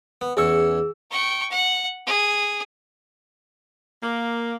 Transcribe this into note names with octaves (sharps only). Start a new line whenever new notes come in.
B3
E2 C#4 G#4 C#6 E6
G5 C#6
F#5
G#4
A#3